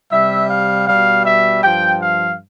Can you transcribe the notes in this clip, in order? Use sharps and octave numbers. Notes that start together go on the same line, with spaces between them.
C3 G3 E5
F5
B2 G3 F5
E5
G2 F3 G5
F5